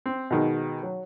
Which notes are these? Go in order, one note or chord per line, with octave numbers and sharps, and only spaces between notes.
C4
B2 D#3 G#3
F#3